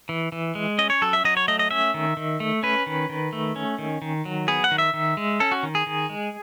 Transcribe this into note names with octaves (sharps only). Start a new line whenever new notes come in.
E3
E3
G#3
C#4 D#5
C#5
F#3 A4
E5
F#3 D#5
C#5
A3 D#5
D#5
C#4 E5
D#3
D#3
A3
C#4 B4
D#3
D#3
A3
C#4
D#3
D#3
F#3
B3 G#4
F#5
D#3
E5
D#3
G#3
C#4 A4
F#4
D#3
G#4
D#3
G#3